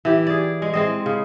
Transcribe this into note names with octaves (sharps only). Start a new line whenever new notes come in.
E3 G4
G#4 D5
G#3
G#3 C4 D#5
C#3